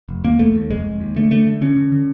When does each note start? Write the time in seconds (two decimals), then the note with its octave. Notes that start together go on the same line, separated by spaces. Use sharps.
0.09 F1
0.24 D#2 A#3
0.39 F1 A3
0.55 D#2
0.70 F1 G#3
0.85 F1
1.00 D#2
1.16 D3 A3
1.31 D3 A3
1.47 D3
1.61 D3 C#4
1.77 D3
1.92 D3